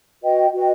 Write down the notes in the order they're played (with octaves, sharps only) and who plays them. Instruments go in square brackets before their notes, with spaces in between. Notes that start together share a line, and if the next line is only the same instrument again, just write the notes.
[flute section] F#4 B4 D#5 G5
F#4 B4 D#5 G5